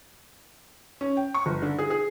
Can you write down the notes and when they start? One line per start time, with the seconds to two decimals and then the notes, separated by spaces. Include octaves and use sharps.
1.01 C#4
1.17 G5
1.34 C#6
1.46 G1
1.62 D3
1.79 G#4
1.90 G#4